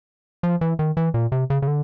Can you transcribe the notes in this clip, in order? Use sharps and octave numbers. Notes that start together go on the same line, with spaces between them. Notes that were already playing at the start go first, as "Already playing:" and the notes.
F3
E3
D#3
E3
A#2
C3
C#3
C#3
D3